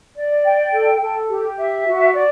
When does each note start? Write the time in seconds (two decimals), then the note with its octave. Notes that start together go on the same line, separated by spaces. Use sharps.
0.16 D5
0.45 G5
0.73 A4
1.02 A4
1.30 G4
1.58 E5
1.87 F#4
2.14 D5